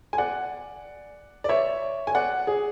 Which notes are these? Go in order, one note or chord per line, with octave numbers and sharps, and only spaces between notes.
G#5
D5 F#5
D5
C#5 E5
G#5
D5 F#5
G#4